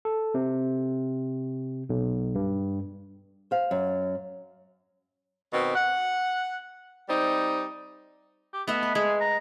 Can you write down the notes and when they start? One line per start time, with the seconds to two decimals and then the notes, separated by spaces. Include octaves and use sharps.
0.05 A4
0.34 C3
1.90 B1
2.35 G2
3.51 C5 F5
3.71 F#2
5.53 B2 D#3 C4
5.76 F#5
7.09 G3 C4 D#4
8.53 G4
8.68 A3 B3 D#5 E5
8.83 B4
8.95 G#3 G#4
9.21 A#5